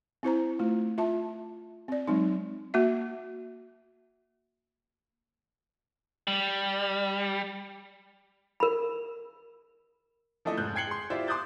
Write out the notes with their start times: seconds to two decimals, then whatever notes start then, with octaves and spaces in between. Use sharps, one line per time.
0.23 C4 E4 C5 A#5
0.59 A3 F4
0.98 F4 E5 A5
1.88 C4 D5
2.08 F#3 G#3 C4 D#4
2.74 A#3 F#4 E5
6.27 G3
8.60 A#4 B5
10.45 F3 A3 D4 E4 A4 D#5
10.57 F1 G#2 F#6 G6
10.75 G5 G#6 C7 C#7 F#7 G7
10.87 G#4 C6
11.10 E4 F4 G4 C5 D5 E5
11.27 C6 D6 D#6 F#6 G6 A6